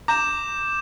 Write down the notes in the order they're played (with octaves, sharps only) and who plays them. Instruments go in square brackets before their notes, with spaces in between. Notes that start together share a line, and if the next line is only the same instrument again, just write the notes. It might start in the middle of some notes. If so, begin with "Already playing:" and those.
[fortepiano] A#5 [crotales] D6 G6 E7